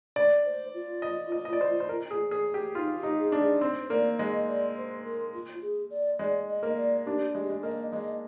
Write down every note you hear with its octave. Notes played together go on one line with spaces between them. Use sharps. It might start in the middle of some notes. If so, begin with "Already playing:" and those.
D5
C5
F4
D#5
D#5
D#5
D5
C5
C5
A#4
G#4
G#4
G4
D#4 F4
G4
D#4
G#4
D4
G#4
C4 C5
A#3 D5
G#3 D#5
D5
C5
A#4
F4
G#4
D5
G#3 D5
D#5
A#3
D5
D4 G4
G#3 G4
G#3
A#3 D#5
G#3 D#5